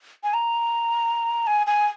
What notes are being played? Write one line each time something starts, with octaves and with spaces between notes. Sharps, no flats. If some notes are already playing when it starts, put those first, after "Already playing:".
G#5
A#5
G#5
G#5